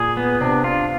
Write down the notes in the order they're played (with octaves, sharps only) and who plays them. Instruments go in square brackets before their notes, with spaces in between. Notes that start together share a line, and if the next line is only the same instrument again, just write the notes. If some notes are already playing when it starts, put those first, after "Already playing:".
Already playing: [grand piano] A#2 [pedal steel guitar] G#4
[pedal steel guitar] B3
[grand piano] C3 [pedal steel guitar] D4
[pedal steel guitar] F4